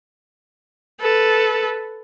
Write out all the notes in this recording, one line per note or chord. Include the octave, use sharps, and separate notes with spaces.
A4 B4